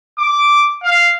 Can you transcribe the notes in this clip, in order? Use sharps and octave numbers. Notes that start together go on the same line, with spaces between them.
D6
F5